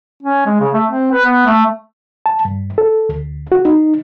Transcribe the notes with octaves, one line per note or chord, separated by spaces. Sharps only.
C#4
G#3
C#3
A3
C4
B4
B3
A3
A5
G2
A4
D2
F#4
D#4